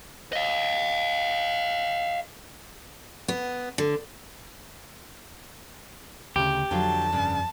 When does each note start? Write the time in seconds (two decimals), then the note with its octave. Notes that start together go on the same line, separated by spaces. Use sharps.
0.33 D#5 F5
3.28 B3
3.78 D3
6.36 D2 C#3 G4
6.71 F2 D3 F#3 F4 A5
7.12 G2 C#3